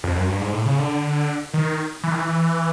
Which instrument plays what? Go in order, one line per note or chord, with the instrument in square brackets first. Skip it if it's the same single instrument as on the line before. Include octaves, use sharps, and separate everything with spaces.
[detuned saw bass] F2
F#2
G2
G#2
A2
C#3
D3
D#3
E3
D#3
E3
E3